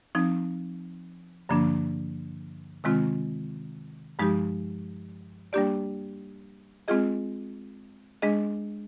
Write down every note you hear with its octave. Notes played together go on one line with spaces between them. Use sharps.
F3 C4 D#4
G2 D3 F3 A#3 D4
C3 D#3 G#3 C4 F4
G2 F3 G#3 D#4 G4
G3 A#3 D4 G4 D5
G#3 C4 F4 G#4 D#5
G#3 D4 G#4 D#5